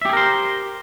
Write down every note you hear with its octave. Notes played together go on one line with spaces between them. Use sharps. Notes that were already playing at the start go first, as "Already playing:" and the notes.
G4 G#4 A#4 C5 E5